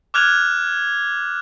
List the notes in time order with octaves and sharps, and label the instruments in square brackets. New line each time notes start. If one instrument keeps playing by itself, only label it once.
[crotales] D6 F6 F#6 G#6 F7